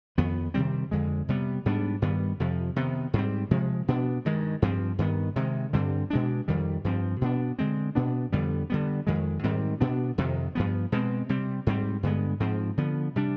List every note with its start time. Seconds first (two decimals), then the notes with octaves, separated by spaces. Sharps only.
0.18 F2 D#3 B3
0.54 C3 D#3 G3 C4
0.91 F2 D3 G#3
1.28 C3 G3 B3
1.66 G#2 G3 B3 D4
2.02 G2 D#3 G3 B3
2.40 F2 C3 F3
2.76 C3 D#3 B3
3.13 G#2 G3 C4
3.51 C3 F3 G#3
3.88 B2 B3 D4
4.25 G2 D#3 G#3
4.62 G2 F3 C4
4.99 G2 D#3 B3
5.36 C3 D#3 G#3
5.73 G2 D3 G3 C4
6.10 B2 G#3 D4
6.48 F2 D#3 G3
6.84 G2 F3 C4
7.21 B2 G3 B3 D4
7.59 D3 G#3 C4
7.95 B2 B3 D4
8.33 F2 D3 G3 B3
8.70 D3 G3 B3
9.07 F2 D#3 G#3
9.44 G#2 D#3 G3 C4
9.81 B2 B3 D4
10.18 F2 C3 D#3
10.55 G2 F3 B3
10.92 B2 G#3 C4
11.29 C3 G3 C4
11.67 G#2 G3 C4
12.03 G2 D3 G#3 B3
12.40 G#2 F3 C4
12.77 D3 F3 B3
13.16 C3 G3 D4